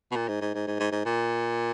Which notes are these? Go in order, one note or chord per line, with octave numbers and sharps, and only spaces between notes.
B2
A#2
G#2
G#2
G#2
G#2
G#2
G#2
A#2